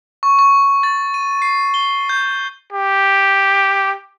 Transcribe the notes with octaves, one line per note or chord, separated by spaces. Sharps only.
C#6
C#6
A6
D#7
C7
G7
G6
G4